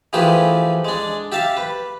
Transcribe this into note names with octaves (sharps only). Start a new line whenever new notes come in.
E3 F3 A3 G4 G#4 B4
G#3 D4
G4 E5 F5 A5
B4